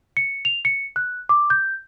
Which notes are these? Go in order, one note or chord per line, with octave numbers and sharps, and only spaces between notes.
C#7
F7
C#7
F#6
D6
G6